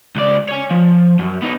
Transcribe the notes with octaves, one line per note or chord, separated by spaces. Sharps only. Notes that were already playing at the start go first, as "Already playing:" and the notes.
C#2 D5
C#5 G#5
F3
F#2
B3 D#4